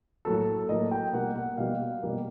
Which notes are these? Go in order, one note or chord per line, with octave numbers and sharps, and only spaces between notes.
A2 F#3 A#3 A4
A2 F#3 A#3 D#5
G5
B2 G3 A#3 F#5
F#5
B2 G3 A#3 F5
B2 G3 A#3